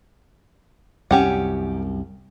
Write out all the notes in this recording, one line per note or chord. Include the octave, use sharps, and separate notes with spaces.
C2 F#2 C#4 G4 F#5